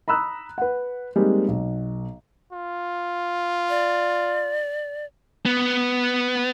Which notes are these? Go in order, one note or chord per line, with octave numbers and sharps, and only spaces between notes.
A#5 B5 D#6 E6 F#6
B4 F#5
G3 G#3 A#3 C4 D#4
B1
F4
D5
B3